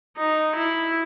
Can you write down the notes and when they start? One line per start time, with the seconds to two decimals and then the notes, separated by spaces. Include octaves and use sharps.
0.17 D#4
0.55 E4